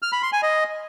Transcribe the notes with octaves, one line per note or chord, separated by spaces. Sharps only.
F6
B5
C6
G#5
D#5